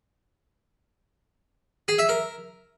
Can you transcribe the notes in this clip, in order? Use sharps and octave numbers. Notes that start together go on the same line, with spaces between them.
G#4
E5
A#4